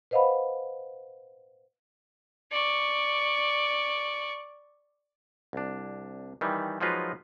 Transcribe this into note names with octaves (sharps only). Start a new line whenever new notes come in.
B4 C5 D#5 F5 F#5 B5
D5 C#6
C2 D4
D#3 E3 G3
F3 F#3 G#3 D#4 F4 B4